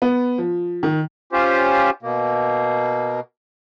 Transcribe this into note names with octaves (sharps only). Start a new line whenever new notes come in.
B3
F3
D#3
C#4 F4 G4 C5
B2 A#3